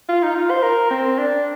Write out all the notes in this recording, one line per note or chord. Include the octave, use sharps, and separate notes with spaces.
F4
D#4
F4
C5
A#4
C4
D4